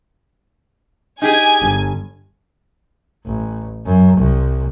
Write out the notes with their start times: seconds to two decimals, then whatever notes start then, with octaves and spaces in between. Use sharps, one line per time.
1.22 D#4 G4 G#4 G#5 G#6
1.61 G1
3.25 A1
3.85 F#2
4.17 C2